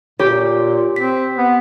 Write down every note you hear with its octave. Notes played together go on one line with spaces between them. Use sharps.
A#2 G4 C#5
C4 B6
B3